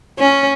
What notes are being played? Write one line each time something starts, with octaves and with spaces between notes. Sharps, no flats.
C#4